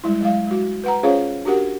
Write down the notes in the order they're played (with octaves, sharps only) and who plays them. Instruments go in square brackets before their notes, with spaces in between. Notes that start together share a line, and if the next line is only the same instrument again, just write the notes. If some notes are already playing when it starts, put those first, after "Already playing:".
[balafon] G3 G#3 E4
F#3 G#3 F5
G#3 F#4
B4 F#5 A#5
C#4 F4 G#4 C5 C#5 F5
D4 F#4 G4 A#4 F#5